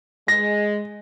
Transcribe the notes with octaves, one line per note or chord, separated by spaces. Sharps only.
G#3 A#6